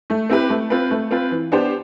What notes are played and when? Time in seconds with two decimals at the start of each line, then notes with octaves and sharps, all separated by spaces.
0.10 A3
0.30 C4 E4 G4 B4
0.49 A3
0.70 C4 F4 B4
0.91 A3
1.11 C4 F4 B4
1.31 E3
1.52 B3 D4 G4 C5